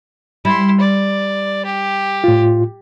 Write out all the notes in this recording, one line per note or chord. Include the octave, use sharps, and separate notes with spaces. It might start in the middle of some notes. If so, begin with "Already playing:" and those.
G3 E4 C6
D5
G4
A2 F4